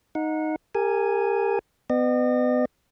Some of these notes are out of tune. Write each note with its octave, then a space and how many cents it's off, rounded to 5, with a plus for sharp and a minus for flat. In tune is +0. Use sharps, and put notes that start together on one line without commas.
D#4 +0 F#5 -25
G4 +30 A#4 -20 G#5 +0
B3 +30 D#5 -40